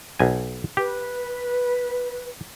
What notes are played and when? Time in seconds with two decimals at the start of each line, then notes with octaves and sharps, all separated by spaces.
0.19 B1 G#5
0.77 G4 B4